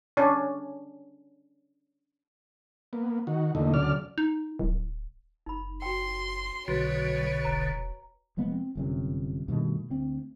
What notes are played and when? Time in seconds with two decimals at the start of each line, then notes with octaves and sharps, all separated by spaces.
0.17 C#4 D4
2.93 A#3 B3
3.27 D#3 F#4
3.55 E2 A#2 D3 A3 D#4
3.74 D2 C#3 F#3 D5 F6
4.18 D#4
4.59 D1
5.46 F#1 D#4 B5
5.82 F#4 G5 C6
6.68 B1 B2 D3 F#3 F#4 B4 C#5
7.45 E1 A#5
8.37 F1 F3 G#3 B3
8.52 C4
8.75 G1 F#2 C3
9.48 G2 B2 D#3 A3
9.90 D2 C4